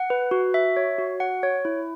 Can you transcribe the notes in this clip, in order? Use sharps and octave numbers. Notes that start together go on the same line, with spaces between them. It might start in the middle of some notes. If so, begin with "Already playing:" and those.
Already playing: F#5
B4
F#4
E5
C#5
F#4
F#5
C#5
E4